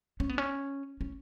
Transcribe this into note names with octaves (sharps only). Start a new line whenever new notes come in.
C#4
B3
C#4
C#4